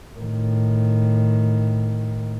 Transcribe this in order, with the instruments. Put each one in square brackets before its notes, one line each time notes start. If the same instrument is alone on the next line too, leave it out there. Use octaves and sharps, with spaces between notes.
[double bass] A2 D#3